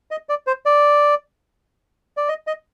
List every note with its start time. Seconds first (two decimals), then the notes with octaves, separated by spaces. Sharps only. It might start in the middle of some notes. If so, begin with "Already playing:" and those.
0.11 D#5
0.29 D5
0.47 C5
0.66 D5
2.17 D5
2.29 D#5
2.47 D#5